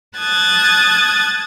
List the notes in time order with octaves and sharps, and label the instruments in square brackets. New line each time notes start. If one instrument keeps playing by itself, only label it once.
[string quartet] A5 D#6 F#6 G#6 A6